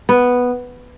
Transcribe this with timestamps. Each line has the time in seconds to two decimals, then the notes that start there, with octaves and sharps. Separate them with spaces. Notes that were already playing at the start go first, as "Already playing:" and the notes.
0.09 B3